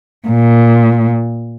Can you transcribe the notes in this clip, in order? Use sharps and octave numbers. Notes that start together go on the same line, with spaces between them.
A#2